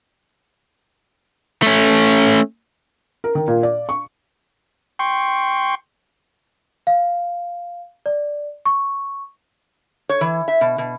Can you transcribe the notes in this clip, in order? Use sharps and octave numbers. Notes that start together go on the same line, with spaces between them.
A3 C#4
A#4
D#3
A#2
D5
C#6
G5 C6 C#6
F5
D5
C#6
C#5
E3
E5
B2
B2